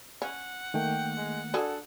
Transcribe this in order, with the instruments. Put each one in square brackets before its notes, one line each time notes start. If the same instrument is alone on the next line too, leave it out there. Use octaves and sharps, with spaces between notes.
[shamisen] C#4 [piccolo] F#5
[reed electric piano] D#3 A3 A#3 [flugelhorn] G5
[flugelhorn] G#3
[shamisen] D3 F#4 G#4 [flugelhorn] A4